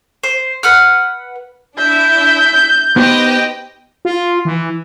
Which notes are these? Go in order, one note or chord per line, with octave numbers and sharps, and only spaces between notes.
C5
B4 F#5 F6
D4 E4 E5 G6
B3 D#4 G4 B4 C5 D#5 G5
F4
E3